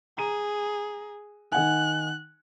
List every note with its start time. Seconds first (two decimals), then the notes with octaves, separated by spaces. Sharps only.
0.18 G#4 A#5 D#7
1.52 D#3 F#5 G#5 F#6